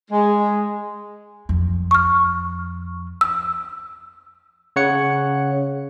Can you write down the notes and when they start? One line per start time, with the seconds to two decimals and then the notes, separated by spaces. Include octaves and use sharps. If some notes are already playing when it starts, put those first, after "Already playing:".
0.11 G#3
1.49 F2
1.91 C#6 F6
3.21 E6
4.76 C#3 C#5 F#5 C#7